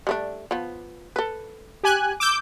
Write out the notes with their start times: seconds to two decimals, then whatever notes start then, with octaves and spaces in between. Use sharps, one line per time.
0.07 G3 A3 D4
0.51 F3 B3
1.16 A4 B4
1.83 G4 G#5 F#6
2.20 D6 E6 G6